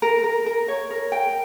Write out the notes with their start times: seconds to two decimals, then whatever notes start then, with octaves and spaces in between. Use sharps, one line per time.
0.02 A#4
0.24 A#4
0.46 A#4
0.68 C#5
0.90 A#4
1.12 G5